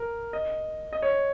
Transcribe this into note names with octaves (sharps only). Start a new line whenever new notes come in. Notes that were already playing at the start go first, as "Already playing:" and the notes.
Already playing: A#4
D#5
D#5
C#5